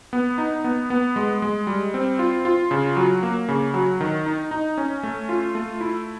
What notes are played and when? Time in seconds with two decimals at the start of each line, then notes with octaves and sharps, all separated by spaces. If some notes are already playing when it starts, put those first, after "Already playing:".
0.13 B3
0.38 D#4
0.64 B3
0.90 B3
1.16 G#3
1.42 G#3
1.67 G3
1.94 C4
2.19 F4
2.45 F4
2.71 C#3
2.96 F#3
3.23 A#3
3.48 C#3
3.74 F#3
4.01 D#3
4.26 D#4
4.51 D#4
4.78 C#4
5.03 A3
5.29 F4
5.55 A3
5.81 E4